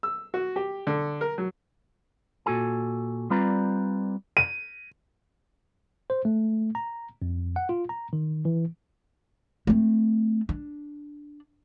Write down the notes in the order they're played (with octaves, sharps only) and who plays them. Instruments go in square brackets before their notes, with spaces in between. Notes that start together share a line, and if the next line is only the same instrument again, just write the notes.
[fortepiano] E6
F#4
G4
D3
A#4
F#3
[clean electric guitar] A#2 F#4 A4 G#5
G3 C4 F4 B4 D5 A#5
[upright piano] D#7
[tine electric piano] C5
A3
A#5
F2
F#5
F4
A#5
D#3
E3
[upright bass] A3 C4
D4